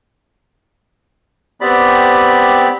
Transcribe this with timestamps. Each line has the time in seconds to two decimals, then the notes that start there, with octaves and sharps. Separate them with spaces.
1.61 B3 C4 G4 D5 B5